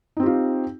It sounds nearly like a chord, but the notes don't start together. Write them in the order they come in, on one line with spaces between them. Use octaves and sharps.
D#4 C4 G4 F4